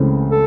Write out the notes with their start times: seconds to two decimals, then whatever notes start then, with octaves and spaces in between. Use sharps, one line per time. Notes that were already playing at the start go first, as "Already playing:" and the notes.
Already playing: C#2 C#3 E3 A3 C4
0.31 A4